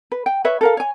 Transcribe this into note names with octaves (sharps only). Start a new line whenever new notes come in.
B4
G5
B4 C#5 E5
A4 A#4 F5
C#5 G#5